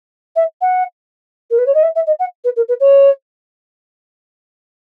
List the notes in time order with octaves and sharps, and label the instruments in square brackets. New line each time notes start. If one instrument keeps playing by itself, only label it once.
[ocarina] E5
F#5
A#4
B4
C#5
D#5
E5
E5
D#5
F#5
B4
A#4
B4
C#5